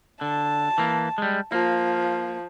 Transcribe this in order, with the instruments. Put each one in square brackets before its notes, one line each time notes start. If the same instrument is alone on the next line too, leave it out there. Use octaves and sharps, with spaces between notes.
[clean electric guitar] D3 [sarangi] A5
[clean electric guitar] E3 A#3
G3 G#3
[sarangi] F3 [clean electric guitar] A#3